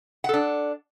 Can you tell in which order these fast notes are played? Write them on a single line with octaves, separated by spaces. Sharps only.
F#5 A4 D4